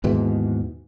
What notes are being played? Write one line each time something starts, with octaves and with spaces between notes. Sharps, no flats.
D#2 G#2 B2 E3